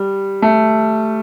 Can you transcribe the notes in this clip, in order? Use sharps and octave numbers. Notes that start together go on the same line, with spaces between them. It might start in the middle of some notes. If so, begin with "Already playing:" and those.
Already playing: G3
A3